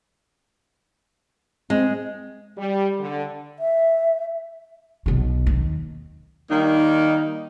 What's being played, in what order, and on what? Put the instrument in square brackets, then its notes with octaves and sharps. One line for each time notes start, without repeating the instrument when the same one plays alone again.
[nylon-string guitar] G#3 [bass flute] C4
[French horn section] G3
D3
[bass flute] E5
[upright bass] B1 B3
D#2
[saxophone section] D#3 G3 A#3 D#4